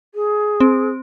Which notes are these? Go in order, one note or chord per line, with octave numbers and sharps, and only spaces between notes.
G#4
C4